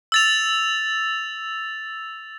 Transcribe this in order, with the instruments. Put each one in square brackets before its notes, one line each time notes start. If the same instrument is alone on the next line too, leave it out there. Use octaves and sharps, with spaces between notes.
[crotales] E6 A6 F7